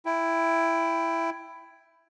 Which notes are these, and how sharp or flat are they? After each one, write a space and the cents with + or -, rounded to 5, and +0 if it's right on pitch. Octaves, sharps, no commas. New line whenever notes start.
E4 +10 G5 +5